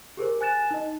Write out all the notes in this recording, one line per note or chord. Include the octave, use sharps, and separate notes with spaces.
G4 G#4 A#4 C5
G#5 F#6 A6 E7
D#4 D#5